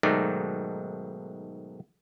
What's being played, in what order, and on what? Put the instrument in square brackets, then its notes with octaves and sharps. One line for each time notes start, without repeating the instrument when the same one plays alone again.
[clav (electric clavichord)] B1 G#2 D#3 A3 D5 A#5